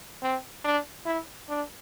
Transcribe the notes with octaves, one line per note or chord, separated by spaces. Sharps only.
C4
D4
E4
D4